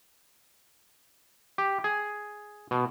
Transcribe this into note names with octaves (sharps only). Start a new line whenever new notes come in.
G4
G#4
B2